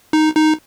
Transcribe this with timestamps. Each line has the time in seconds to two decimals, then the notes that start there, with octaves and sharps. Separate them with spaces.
0.13 D#4
0.36 D#4